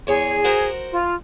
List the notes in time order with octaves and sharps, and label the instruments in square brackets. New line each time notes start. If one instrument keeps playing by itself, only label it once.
[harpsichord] E2 C#5 [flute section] G#4
[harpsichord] F#4 A#4 C5
[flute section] F4